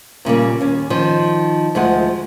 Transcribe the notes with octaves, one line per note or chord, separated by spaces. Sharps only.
A#2 C#3 G3 A#3
D#2 C#4
D#3 F3
D2 F3 G#3 F#5